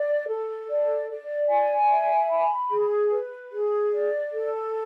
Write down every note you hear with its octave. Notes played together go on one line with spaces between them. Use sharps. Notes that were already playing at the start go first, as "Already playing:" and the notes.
Already playing: D5
A4
D5
D5
G#5
E5
B5
G#4
B4
G#4
D5
A4